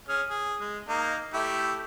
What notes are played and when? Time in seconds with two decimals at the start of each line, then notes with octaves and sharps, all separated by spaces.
0.08 C#4 G#4 F6
0.30 G#4
0.59 G#3
0.89 A#3 D#4
1.34 A3 E4 G4